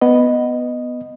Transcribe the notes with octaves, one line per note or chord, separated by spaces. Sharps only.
B3 D#5